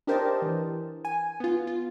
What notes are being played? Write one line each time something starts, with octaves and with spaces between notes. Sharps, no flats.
D4 G4 A#4 C5 D#5 A5
E3
G#5
B3 F4
F4